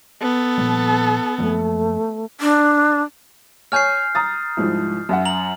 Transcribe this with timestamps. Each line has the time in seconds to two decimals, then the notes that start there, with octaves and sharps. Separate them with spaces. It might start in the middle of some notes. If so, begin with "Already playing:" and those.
0.22 B3 A4
0.58 A#2 F3 G3
1.39 F#2 F3 A3 A#3
2.40 D4
3.72 C#5 G#5 F6 G6 C7
4.15 A#5 D#6 A6
4.57 C2 G#2 F3
5.09 F#2 E5 F#5
5.25 A#5 F#7